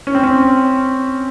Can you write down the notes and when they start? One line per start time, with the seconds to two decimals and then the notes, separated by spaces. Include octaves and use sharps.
0.07 C#4
0.15 C4
0.23 C#4